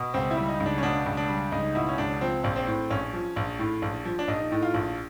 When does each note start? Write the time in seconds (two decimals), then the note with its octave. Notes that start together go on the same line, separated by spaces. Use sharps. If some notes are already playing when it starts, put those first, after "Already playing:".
Already playing: B2
0.14 C#2 C4
0.31 E4
0.37 G3
0.49 D#4
0.60 C#2
0.66 D4
0.78 C#4
0.83 B2 D4
1.06 C#2
1.17 D4
1.29 G3
1.52 C#2 D#4
1.75 B2 E4
1.89 C#4
1.98 C#2 D4
2.21 F3 C4
2.44 A#1
2.56 C4
2.67 A2
2.90 A#1 C#4
3.13 F3
3.36 A#1
3.59 A2
3.82 A#1
4.05 F3
4.19 D4
4.28 A#1 D#4
4.52 A2
4.63 F4
4.74 A#1